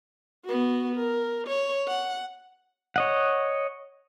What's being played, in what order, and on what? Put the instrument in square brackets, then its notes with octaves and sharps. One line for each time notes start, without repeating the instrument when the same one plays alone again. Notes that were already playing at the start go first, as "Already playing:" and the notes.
[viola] B3 F#4
A#4
C#5
F#5
[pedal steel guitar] C#5 D#5 F#5